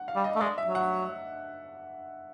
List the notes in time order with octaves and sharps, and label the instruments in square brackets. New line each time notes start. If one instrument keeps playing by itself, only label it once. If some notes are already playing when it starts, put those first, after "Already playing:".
Already playing: [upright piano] F#5
F5
[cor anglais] G3
[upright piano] D#5
[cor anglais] A3
[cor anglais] G#3 [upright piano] D5
[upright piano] E5
[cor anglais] F#3
[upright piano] F#5